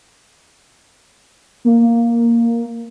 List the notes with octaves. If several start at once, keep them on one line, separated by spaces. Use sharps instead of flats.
A#3